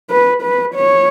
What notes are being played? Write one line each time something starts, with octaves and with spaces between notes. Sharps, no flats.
B4
B4
C#5